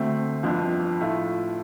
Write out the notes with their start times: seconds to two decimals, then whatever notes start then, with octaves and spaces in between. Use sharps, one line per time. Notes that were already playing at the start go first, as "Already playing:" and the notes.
Already playing: D2 D3 A3 C4
0.43 G1 F2 F3 D4
1.01 A2 A3 F4